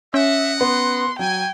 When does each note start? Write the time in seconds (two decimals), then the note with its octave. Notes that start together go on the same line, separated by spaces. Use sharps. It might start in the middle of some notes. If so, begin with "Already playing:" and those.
0.14 C#4 D#5 E5 F#5
0.61 B3 C6
1.19 F#3 G5 G#5